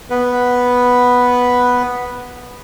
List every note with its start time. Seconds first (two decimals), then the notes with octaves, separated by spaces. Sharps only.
0.10 B3 B4